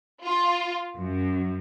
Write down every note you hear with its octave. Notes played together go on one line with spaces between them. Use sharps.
F4
F#2